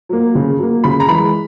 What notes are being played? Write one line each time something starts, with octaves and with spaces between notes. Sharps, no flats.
F#3 A#3
C#3
F#3 A#3
C#3 B5
A#5
E3 G#3 B5